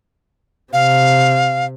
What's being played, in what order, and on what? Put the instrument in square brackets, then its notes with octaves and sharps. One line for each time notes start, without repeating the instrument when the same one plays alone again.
[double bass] C3 [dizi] F5